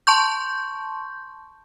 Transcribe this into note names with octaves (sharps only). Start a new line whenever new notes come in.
A5 C6 C#6 G6